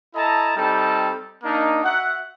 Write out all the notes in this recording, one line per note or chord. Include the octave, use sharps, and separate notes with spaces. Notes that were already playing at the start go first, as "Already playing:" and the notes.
E4 A4 D#5 A5 A#5
G3 C4 D#4 A4 A5
A#3 D4 D#4
F#4 E5 F#5